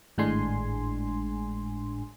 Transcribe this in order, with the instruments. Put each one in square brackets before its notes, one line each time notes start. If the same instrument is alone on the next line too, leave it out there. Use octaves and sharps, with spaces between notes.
[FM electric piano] G#1 A2 G#3 D4 G#5 C6